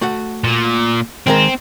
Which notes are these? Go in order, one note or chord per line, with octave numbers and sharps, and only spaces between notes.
A3 F#4 F#5
A#2
D#3 G#3 C4 A#4